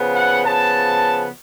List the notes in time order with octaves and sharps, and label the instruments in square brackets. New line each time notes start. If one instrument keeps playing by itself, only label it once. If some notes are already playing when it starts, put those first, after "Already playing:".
Already playing: [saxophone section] C#3 F3 B3
[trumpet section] F#5
[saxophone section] C#3 F3 B3 [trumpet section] A5